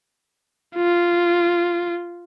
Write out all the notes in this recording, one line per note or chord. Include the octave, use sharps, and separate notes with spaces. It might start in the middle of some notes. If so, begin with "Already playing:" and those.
F4